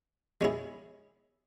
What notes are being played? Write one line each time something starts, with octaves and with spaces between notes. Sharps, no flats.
G#3 C#4 E4 G#4